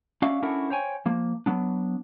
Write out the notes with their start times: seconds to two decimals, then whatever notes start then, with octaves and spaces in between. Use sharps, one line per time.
0.22 C#4 F#4 D5 E5 F5
0.42 C#4 D4 E4 F#4 A4 A#4
0.70 C5 C#5 G5 G#5
1.06 F3 A#3
1.46 F#3 B3 D4